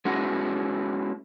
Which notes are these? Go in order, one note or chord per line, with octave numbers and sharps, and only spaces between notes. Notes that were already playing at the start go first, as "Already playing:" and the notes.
G#3 B3 C#4 E4 F#4